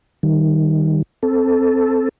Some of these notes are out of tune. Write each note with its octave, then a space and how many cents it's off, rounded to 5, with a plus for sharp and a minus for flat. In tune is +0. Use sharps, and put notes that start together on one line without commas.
D#3 +0 G3 +0
C4 +0 A4 +0